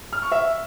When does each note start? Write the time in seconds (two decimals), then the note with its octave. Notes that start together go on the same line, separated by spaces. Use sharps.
0.13 F6
0.22 C#6
0.32 E5